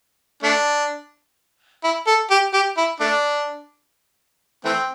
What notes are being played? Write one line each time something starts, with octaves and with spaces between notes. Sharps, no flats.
A3 D4
E4
A4
G4
G4
E4
A3 D4
E3 A3 C4